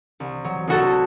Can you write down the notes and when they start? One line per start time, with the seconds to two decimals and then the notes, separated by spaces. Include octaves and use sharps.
0.20 C2
0.45 F#3
0.67 C2 F#4 A4